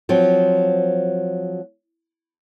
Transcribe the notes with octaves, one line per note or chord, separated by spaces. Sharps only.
F3 F#3 C4